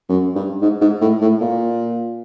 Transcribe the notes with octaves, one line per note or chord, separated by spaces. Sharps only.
F#2
G2
G#2
G#2
A2
A2
A#2